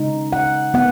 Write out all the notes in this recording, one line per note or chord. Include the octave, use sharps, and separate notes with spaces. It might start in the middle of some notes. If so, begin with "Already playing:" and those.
Already playing: C#3 G#3 D#4
F#5
B3 F#5